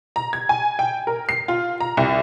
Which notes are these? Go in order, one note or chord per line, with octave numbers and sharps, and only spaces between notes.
A#5
G#6
G#5
G5
A#4
C7
F4
A#5
C2